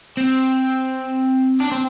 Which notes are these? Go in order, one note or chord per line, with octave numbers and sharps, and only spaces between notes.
C4
D4
C4